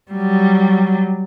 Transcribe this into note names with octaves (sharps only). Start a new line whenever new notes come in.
F#3 G3